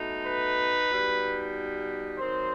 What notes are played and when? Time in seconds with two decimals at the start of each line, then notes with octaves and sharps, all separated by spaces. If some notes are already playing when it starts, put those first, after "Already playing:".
Already playing: B2 A3 D#4
0.25 B4
0.89 B2 G3 D#4
2.19 D#3 F#3 C4 D#4 C5